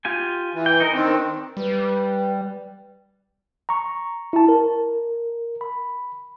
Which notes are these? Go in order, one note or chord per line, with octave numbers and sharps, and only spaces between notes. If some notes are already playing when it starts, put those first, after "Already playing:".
F4 G4 G#5
E3
G5
D#4 A#4
D#3 C4 D4
G3 B4
A#5 C#6
E4 A5
A#4
B5